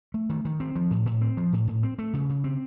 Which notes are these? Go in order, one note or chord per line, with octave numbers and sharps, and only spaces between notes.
A3
D#3
D#3
C4
F3
A2
A2
C4
F3
A2
A2
C4
A3
C#3
C#3
C4